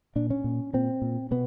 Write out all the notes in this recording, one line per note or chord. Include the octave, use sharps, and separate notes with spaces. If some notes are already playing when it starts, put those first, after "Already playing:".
A#2 D4
C#4
A#2
A#2 C4
A#2
B2 B3